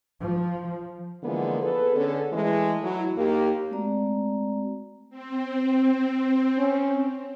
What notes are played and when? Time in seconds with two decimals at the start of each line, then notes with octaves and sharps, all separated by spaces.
0.21 F3
1.23 D3 E3 F3 G#3 A#3 B3
1.61 B3 G#4 A4 B4
1.96 D3 B3 C#4 G#4 A4
2.32 E3 G#3 A3
2.83 F#3 E4
3.17 D#2 A#3 G4
3.71 G#3 A3 C4 F#4 D5 A#5
5.10 C4
6.58 C#4